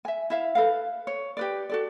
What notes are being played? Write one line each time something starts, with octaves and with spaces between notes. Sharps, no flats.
E5 G#5
E4 E5 F5
A4 B4 F5
C#5
G4 B4 D5
F#4 A4 D5